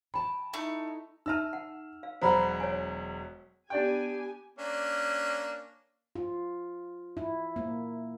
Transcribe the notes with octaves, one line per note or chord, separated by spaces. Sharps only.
G5 A5 B5
A3 D#4 E4
D#4 E5 A5 E6 F6
F#5
F5
E1 F#3 C5 F#5 A#5 B5
C#5 G#5
B3 D4 G4 D5 G5 G#5
A#3 C#4 D4
F4
E4
A#3